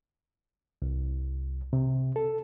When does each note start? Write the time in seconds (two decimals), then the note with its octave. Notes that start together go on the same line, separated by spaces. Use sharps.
0.82 C2
1.73 C3
2.16 A4